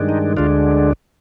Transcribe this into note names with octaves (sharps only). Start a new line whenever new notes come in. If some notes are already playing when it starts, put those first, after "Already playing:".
Already playing: G2 D#3 G#3 D4
D#4
D2 D3 G#3 D4 F4